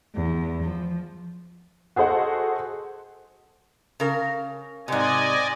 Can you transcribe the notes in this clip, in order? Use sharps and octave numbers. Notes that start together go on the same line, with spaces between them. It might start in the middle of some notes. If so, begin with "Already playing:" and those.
E2
F3
F#4 G#4 A4 C5 D#5 F#5
C#3 A#4
G#2 C3 D5 D#5 G#5